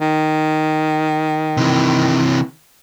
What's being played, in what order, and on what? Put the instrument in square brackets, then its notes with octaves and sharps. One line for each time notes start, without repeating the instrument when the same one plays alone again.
[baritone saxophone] D#3
[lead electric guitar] C3 E3